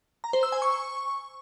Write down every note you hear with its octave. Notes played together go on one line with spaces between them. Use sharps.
A#5
C5
E6
G#5
C#6